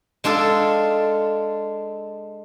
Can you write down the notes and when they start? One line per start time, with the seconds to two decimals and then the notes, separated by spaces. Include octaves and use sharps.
0.24 G#3 D4 F4 A4